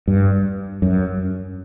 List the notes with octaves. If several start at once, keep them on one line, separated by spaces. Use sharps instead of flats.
G2
F#2